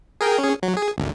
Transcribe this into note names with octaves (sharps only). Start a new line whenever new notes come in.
G#4 A#4 G5
C#4 G#4
F#3
G#4
G#1 D2